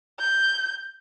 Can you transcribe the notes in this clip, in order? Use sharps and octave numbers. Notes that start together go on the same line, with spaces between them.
G6